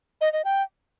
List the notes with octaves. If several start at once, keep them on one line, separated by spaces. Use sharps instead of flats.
D#5
D#5
G5